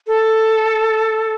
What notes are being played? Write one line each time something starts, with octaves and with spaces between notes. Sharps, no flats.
A4